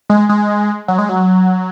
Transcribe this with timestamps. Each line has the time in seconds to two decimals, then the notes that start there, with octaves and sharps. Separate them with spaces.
0.10 G#3
0.29 G#3
0.88 F#3
0.98 G#3
1.09 F#3